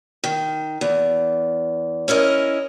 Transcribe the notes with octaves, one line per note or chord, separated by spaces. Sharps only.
D#3
E2
C#4 E4 A#4 D#5